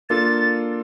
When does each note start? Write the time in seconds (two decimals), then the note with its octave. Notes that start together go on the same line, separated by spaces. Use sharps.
0.10 A#3 D4 F4 A4 A6
0.28 A6